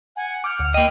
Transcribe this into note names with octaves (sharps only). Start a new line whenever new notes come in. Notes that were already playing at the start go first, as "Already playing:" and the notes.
F#5 G#5
D6 F6 G6
D2
A#3 D#5 G5